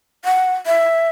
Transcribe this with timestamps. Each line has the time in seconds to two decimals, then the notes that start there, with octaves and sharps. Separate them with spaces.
0.25 F#5
0.66 E5